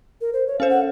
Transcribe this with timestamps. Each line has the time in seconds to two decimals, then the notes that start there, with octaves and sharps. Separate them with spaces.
0.21 A#4
0.33 C5
0.47 C#5
0.59 C#4 A4 C5 F5
0.70 F#5